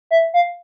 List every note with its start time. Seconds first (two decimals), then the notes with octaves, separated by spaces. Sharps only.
0.11 E5
0.34 F5